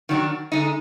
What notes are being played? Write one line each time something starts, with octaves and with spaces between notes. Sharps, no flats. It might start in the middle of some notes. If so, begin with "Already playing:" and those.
D#3 F#3 D4 F#4
D3 G#3 D#4